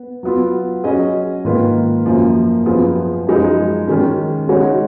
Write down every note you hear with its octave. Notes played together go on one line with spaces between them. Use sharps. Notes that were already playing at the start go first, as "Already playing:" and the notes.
Already playing: B3
F#3 B3 F4
F#3 C#4 G#4 D#5
G#2 D#3 A#3 F4 B4
F#2 F3 A#3
F#2 F3 B3 F4 G#4
F#2 F3 G#3 D#4 G#4
D#3 G#3 C#4
C#3 G#3 D#4 F#4 C#5